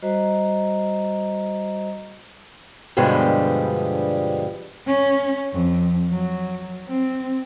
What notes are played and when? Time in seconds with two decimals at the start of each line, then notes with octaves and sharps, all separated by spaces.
0.02 G3 F#4 C5 D#5 A#5
2.97 G2 B2 D3 F3 G3 G#3
4.86 C#4
5.53 F2
6.10 F#3
6.87 C4